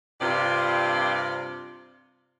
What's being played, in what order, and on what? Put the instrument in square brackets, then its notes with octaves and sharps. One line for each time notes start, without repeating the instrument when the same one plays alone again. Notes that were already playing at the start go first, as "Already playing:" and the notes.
[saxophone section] G2 C3 F4 D5